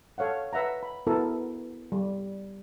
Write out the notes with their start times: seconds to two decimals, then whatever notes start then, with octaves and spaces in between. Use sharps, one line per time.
0.18 A4 C#5 F5 F#5
0.53 B4 E5 F#5 A#5
0.83 B5
1.07 B3 E4 F#4 A4 A#4
1.92 G3